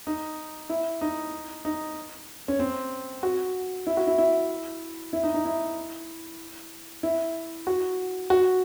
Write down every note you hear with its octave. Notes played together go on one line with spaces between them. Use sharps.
D#4
E4
D#4
D#4
C#4
C4
F#4
E4
F#4
E4
E4
E4
D#4
D#4
E4
E4
F#4
F#4